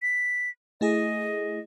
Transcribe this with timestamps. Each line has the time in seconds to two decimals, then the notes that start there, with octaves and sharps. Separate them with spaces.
0.02 B6
0.81 A3 E4 G#4 D#5